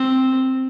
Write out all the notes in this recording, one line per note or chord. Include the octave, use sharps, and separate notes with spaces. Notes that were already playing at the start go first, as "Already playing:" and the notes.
Already playing: C4